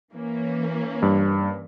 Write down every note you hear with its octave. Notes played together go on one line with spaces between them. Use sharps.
E3 A#3 C#4
G2